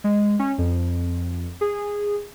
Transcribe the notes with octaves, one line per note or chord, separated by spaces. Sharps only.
G#3
C#4
F2
G#4